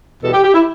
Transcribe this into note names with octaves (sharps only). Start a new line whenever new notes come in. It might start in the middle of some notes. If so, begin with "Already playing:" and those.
E2 B2 G3 A4
G4
G4
E4